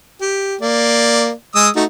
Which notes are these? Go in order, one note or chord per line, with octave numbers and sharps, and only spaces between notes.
G4
A#3 D5
G#3 D#6 E6
A3 D#4 F#4